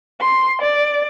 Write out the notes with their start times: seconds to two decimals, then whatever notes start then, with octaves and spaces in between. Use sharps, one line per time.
0.22 C6
0.62 D5